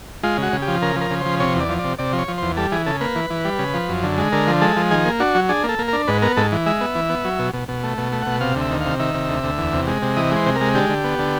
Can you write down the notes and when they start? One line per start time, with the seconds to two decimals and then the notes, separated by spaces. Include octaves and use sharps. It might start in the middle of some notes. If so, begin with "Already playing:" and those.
0.23 G#3 F4
0.38 C#3 F#4
0.53 C#3
0.62 G4
0.68 F3
0.82 C#3 A#4
0.96 F3 A#4
1.11 C#3
1.21 F3 C5
1.40 C3 C#5
1.55 E2
1.60 D5
1.70 F3
1.79 C3 D5
1.99 C3 D5
2.13 F3
2.18 C#5
2.28 F3
2.38 E2 C5
2.57 G3 A4
2.72 E3 G#4
2.86 C#3 A4
3.01 A#3 B4
3.16 E3
3.30 E3
3.45 G3
3.59 C#3
3.74 F3
3.89 F#2
4.03 D3
4.18 G#3
4.32 D3 A#4
4.47 F3
4.61 G#3 A4
4.76 F3
4.91 D#3 G#4
5.05 A#3
5.20 D4 F#4
5.35 F#3
5.49 D4 G#4
5.64 A#3 A4
5.79 A#3
5.88 D4 A#4
6.08 G#2 B4
6.22 B3 A#4
6.37 G#2 A4
6.52 E3
6.66 G#3 E5
6.81 B3
6.95 E3
7.10 B3
7.25 F#3
7.39 B2
7.54 B2
7.68 B2
7.83 A3
7.98 B2
8.12 A3
8.22 B2 F#5
8.41 C3 F5
8.56 D2 E5
8.71 D#3
8.81 C3 F5
8.99 D#3 E5
9.15 C3
9.29 D2
9.44 D2
9.58 E2
9.73 C3
9.87 G#3
10.02 C3
10.17 E3 D#5
10.31 G#3 C5
10.46 C3
10.56 A#4
10.61 G#3
10.75 D3 G4
10.90 D3
11.04 B3
11.19 D3